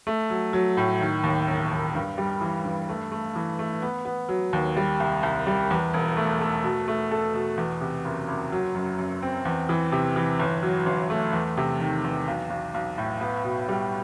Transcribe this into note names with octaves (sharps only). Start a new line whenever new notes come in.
A3
F#3
F#3
A2
D#3
D#2
E1
D#2
G2
G3
E3
G2
A3
A3
E3
A3
B3
B3
F#3
D#2
G3
C2
C2
G3
E2
E1
A3
A3
B2
A3
A4
B2
E2
C3
F#1
F#1
F#3
F#2
F#2
C4
E2
E3
C3
E3
G1
F#3
G1
A3
E2
C3
D#3
E2
B1
B1
B1
A2
B3
B2
G3